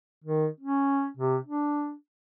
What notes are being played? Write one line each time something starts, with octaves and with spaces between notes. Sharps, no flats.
D#3
C#4
C3
D4